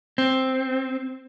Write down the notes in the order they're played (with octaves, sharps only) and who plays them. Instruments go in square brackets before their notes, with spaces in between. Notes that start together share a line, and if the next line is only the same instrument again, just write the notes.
[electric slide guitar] C4